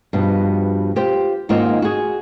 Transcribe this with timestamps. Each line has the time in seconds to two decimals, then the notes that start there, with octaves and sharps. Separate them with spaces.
0.13 G2 B2 F3
0.96 F4 G4 C5
1.49 G#2 D#3 A#3 C4 D#4 F4
1.82 F#4 G#4